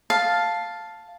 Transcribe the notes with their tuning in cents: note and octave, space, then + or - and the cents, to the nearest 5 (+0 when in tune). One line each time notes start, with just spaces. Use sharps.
F5 +0 A5 +0